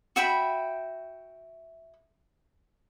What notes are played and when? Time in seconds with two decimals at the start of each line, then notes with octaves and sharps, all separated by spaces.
0.16 F#4 E5 G5 B5